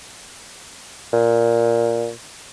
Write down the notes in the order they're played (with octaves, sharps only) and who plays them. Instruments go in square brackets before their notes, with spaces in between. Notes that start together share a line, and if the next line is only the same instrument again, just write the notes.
[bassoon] A#2